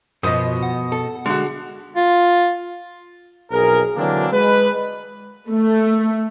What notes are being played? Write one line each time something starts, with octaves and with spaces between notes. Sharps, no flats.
F#2 B2 F3 B3 C5 D#5 D#6
F#5
A4
D3 G#3 F#4
F4
B1 F2 G#4 A#4
D3 E3 F#3 A#3 C4 D4
G#3 B4
A3